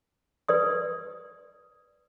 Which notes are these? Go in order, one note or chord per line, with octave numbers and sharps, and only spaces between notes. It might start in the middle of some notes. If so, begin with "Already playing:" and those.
B4 D5 D#6